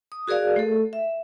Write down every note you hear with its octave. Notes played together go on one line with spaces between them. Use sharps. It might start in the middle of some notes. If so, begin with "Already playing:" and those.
D#6
F#4 G#4 A#4 D5 F5
A3 A4
E5